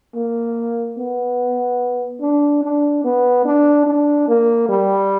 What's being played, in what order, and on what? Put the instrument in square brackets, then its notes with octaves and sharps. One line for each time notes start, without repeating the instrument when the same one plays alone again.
[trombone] A#3
B3
D4
D4
B3
D4
D4
A#3
G3